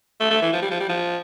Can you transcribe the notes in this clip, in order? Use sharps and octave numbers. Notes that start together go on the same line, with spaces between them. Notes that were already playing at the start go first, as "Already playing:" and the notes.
A3
A3
E3
F3
G3
F3
G3
F3